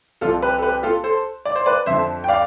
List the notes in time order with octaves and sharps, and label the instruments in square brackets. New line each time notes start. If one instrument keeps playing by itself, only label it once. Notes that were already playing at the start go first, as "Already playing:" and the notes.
[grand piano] C2 C3 F3 F4 A4
G4 B4
A4
G4 B4
G4
F4 A4
A4 C5
D5
C5
B4 D5
F2 D3 F3 C5 E5
G5
D5 F5